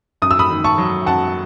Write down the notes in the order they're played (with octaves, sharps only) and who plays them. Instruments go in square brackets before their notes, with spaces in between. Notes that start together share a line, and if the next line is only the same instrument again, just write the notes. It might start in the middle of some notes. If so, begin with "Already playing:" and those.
[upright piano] F#2 D#6
E6
B5 D#6
D#3
A5 C#6
F#3
F#2 F#5 A5